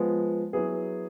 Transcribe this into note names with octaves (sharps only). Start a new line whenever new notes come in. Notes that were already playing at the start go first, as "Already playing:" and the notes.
Already playing: F3 G#3 B3
F#3 B3 E4 G#4